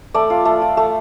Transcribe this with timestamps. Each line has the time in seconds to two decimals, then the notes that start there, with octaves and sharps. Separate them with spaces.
0.14 A3 D5
0.30 F4
0.45 A3
0.62 F4
0.77 A3